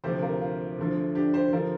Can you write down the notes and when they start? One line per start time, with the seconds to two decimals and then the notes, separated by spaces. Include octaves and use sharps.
0.04 D2 C3 F3 G4 C5
0.22 F4 A#4
0.41 F4
0.78 D2 D3 F3
1.15 D4 G4
1.34 G4 C5
1.53 D3 F3 F4 A#4